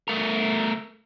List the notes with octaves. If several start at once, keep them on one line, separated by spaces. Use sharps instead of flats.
A3 A#4